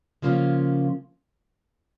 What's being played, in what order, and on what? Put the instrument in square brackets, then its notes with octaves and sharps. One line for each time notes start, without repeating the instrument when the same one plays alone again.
[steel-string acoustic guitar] C#3 F3 A#3 C#4 F4